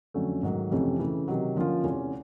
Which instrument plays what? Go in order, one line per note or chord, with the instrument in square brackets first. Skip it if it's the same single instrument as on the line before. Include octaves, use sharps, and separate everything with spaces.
[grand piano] F2 D3 F#3 A3 C#4
G#2 D#3 F#3 A3
F2 C3 E3 A3 C#4
C#3 E3 A3
C3 D#3 F#3
D3 F3 A#3 C#4 F4
E2 C3 E3 A3 C#4